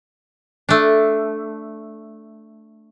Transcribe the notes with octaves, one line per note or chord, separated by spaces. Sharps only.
A3 D4